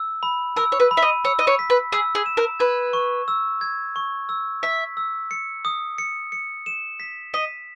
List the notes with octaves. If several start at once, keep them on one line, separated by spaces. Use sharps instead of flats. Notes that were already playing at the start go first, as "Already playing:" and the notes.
Already playing: E6
B5
A#4 E6
C#5
B4
B5
E5
D#5
C#5 E6
D#5
C#5
B6
B4
G#4 E6
G#4
E7
A#4
B4 G#6
C#6
E6
G#6
C#6
E6
E5 B6
E6
C#7
D#6
C#7
C#7
E7
B6
D#5 B6